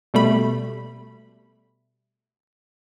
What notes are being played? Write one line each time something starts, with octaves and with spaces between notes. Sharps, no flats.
B2 G3 A3 B5